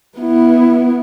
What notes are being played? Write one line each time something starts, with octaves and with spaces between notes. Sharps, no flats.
B3 E4